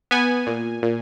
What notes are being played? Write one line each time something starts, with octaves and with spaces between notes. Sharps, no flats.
B3 G#5
A#2
A#2